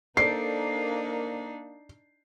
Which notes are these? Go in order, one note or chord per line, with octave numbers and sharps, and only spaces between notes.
A#3 D4 D#4 A4 C5 D5 C7